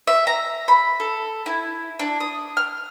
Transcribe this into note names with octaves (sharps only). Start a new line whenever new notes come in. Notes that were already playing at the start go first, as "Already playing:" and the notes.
E5
A#5
B5
A4
E4
D4
D#6
F6